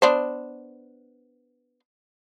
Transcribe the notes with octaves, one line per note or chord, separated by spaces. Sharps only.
B3 D4 C5